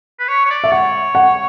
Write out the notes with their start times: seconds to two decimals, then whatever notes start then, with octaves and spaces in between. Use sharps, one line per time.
0.20 B4
0.29 C#5
0.46 C#5
0.50 D5
0.64 E5
0.72 C#5 F#5
1.15 F#5